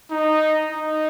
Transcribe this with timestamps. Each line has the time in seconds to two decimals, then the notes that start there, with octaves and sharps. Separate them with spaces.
0.11 D#4
0.72 D#4